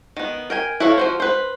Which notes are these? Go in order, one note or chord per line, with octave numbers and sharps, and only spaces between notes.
D#3 B3
A#4 G5 G#5
E4 F#4 A4 C#5 F5
F3 F#4 C5
B4 C5